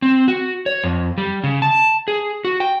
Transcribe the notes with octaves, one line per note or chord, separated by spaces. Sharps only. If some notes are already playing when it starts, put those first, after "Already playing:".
C4
F#4
C#5
F2
G3
C#3
A5
G#4
F#4
G5